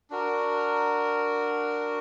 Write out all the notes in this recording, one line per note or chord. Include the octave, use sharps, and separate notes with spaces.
D4 F#4 A#4